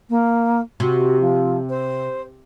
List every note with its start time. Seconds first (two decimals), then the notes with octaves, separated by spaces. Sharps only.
0.09 A#3
0.80 C3 F#4
1.20 F3
1.69 C5